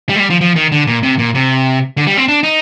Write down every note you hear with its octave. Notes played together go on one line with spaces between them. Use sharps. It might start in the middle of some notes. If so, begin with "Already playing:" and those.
G3
G#3
G3
F3
F3
D#3
D3
A#2
C3
A#2
C3
D3
G3
C4
D4
D#4